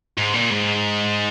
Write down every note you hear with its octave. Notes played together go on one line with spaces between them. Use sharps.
G#2
A#2
G#2